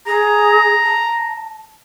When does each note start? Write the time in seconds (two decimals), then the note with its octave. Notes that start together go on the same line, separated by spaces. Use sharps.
0.07 G#4 A#5
0.83 A5